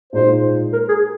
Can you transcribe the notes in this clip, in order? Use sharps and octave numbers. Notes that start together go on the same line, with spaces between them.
A#2 G#3 D#4 C5
A#4
G#4